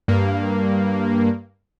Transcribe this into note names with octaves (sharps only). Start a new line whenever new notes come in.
G2 A#3